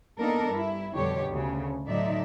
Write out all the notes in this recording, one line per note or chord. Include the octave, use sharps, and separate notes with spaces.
A#3 B3 D4 D#4 A4 A#4
G2 E4
F2 B2 D3 G3 G4 C#5
D2 C#3
A2 D3 F#3 D#4 D5 E5